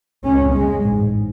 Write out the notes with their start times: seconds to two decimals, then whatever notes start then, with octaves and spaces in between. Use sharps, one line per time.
0.24 C#2 C#3 C#4
0.53 G#3
0.82 A1 G#2